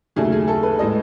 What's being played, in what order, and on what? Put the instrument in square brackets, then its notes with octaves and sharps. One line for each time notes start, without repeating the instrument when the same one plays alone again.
[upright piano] D#2 C#3 F#3 A3 G#4
G#4
A4
B4
A2 G#3 D#5